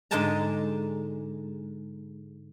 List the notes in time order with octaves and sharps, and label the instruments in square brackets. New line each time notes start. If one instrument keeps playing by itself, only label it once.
[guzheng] G#2 D3 G#3 G5 A5 A#5